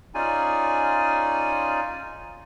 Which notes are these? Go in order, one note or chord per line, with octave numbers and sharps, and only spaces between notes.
C#4 D#4 F4 G#4 D5 G#5